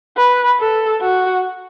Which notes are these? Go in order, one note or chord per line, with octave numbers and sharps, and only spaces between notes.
B4
A4
F#4